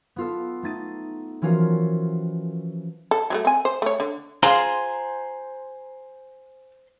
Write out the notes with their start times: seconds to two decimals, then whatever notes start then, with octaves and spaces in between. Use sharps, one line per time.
0.16 B3 F4 A4
0.63 A3 D#4 A6 D#7
1.42 E3 F3 C#4 F4 F#4 A#4
3.11 A4
3.30 F#3 G3 A3
3.45 C4 G#5
3.65 C5
3.82 A3 C#5
4.00 D3
4.43 F4 G#4 C5 A#5 C6